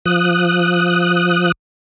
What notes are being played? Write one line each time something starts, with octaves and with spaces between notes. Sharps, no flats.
F3 D#6 F#6